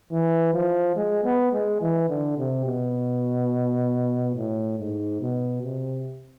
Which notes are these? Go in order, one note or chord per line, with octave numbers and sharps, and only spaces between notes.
E3
F3
G#3
B3
G#3
E3
D3
C3
B2
A2
G#2
B2
C3